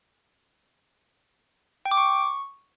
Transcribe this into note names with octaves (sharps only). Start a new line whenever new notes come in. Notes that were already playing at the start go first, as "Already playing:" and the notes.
G5
D6
C#6